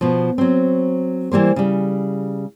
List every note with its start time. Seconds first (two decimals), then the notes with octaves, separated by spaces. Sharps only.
0.01 B2 F3
0.38 F#3 C4
1.32 E3 G3 A#3 C5
1.56 C#3 G3